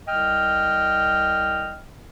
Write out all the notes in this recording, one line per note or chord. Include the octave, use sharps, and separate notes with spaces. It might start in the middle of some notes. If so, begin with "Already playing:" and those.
C2 D#5 G5 F6